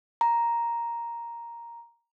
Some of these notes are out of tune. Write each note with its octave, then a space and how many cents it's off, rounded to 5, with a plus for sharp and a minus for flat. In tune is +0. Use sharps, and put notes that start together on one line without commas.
A#5 +5